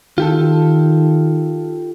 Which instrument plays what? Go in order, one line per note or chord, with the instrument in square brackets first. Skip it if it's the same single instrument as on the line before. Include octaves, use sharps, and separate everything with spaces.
[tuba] D#3 [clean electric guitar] F4 G4 A4